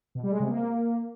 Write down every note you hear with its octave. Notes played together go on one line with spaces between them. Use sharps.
B2
G3
G#3
C3
A#3